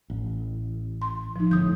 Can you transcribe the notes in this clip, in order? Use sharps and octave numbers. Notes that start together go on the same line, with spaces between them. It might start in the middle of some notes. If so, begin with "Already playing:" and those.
A1
C6
F3 D#4
G1 A2 D#6 G6